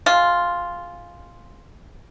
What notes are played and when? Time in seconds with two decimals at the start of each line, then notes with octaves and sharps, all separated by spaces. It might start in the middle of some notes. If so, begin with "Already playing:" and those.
0.06 G#3 F4